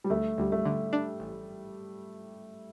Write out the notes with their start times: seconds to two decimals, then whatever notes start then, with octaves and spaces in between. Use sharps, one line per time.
0.04 G3
0.10 D2 A3
0.38 D2 G3
0.52 A3
0.65 D3
0.93 D4
1.20 A1